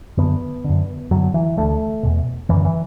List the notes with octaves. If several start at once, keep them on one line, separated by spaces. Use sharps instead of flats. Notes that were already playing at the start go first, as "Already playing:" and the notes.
F#2 D3 B3
F#2 D3
F#2 D3 F#3
E3
D2 D3 A3
E2 B2
F#2 D3 E3
E3